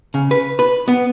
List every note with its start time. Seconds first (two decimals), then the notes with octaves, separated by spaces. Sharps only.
0.14 C#3
0.31 B4
0.59 B4
0.88 B3